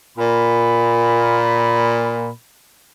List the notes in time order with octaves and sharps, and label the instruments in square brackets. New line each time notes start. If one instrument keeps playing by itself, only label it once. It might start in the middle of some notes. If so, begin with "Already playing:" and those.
[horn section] A#2 B5